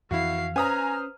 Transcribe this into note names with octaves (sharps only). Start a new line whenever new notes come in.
F2 E3 E4 F#4 F5 C7
C#4 B4 C5 G#5 A#5 D#6 F6